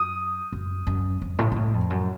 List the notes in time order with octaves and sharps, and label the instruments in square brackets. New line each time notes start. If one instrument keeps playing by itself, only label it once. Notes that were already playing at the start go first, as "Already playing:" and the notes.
Already playing: [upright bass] F#2 [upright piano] D#6
[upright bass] F#2
F#2
F2
A2
A#2
A2
F2
F#2